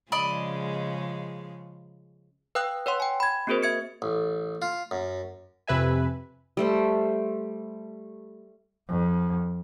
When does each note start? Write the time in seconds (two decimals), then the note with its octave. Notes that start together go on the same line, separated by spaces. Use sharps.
0.12 C#3 F3 G#3 D5 D#5 B5
2.55 B4 F5 G5 D#6 E6 F#6
2.86 B4 C#5 F#5 C6
3.00 G5 G#5
3.20 B5 G#6
3.47 A#3 C4 F#4 G#4 A#4 C5
3.63 E5 G#6 C#7
4.02 A1
4.62 F4
4.91 F#2
5.67 F2 C3 B4 E5 G#5
6.57 G3 A3 C5
8.88 F2